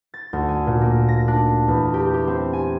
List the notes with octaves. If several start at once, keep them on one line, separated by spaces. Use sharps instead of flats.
A6
D2
G#5
A#2
A#3
A#6
D4
E2
G4
G4
C4
G#5